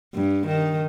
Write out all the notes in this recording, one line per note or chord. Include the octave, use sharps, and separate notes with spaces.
G2
D#3